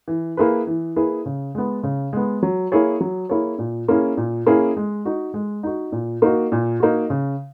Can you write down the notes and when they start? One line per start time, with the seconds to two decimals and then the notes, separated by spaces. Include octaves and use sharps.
0.08 E3
0.37 A#3 E4 G#4 B4
0.67 E3
0.96 A#3 E4 G#4 B4
1.26 C#3
1.55 G#3 B3
1.83 C#3
2.13 G#3 B3
2.43 F#3
2.72 A#3 E4 G#4 C#5
3.01 F#3
3.29 A#3 E4 G#4 C#5
3.59 A#2
3.88 A#3 C#4 E4 G#4
4.17 A#2
4.47 A#3 C#4 E4 G#4
4.77 G#3
5.05 D#4 F#4
5.34 G#3
5.63 D#4 F#4
5.92 A#2
6.22 A#3 D#4 F#4
6.52 A#2
6.80 A#3 D#4 F#4
7.10 C#3